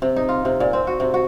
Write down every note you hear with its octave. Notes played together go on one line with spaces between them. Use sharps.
C3
D#4
F4
C3
A#2
C4
F#4
C3
F#4